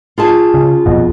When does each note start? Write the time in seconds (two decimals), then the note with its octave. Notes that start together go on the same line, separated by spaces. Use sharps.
0.18 F4 G#4 A5
0.54 C#3
0.86 A#1 F2 B2